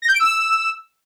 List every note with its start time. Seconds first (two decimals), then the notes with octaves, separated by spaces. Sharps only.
0.02 A#6
0.08 G6
0.14 D7
0.20 E6